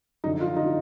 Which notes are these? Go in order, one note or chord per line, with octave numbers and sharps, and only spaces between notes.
F#2 D3 F3 D#4
F4
D#4
D3 F3